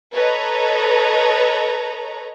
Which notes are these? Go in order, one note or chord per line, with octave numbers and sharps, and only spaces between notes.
A4 B4 C#5 D#5 A#5